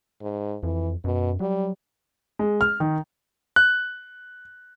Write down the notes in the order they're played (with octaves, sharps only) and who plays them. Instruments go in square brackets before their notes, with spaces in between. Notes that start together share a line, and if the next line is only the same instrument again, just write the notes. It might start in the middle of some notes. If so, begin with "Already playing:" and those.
[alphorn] G#2
[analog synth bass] F2 [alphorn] E3
[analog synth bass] F#2 [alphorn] B2
[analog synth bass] F#3 [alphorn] G3
[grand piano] G#3
F6
D#3
[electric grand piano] F#6